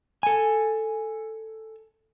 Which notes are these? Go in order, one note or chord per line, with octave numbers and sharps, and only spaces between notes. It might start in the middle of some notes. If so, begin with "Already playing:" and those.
A4 G#5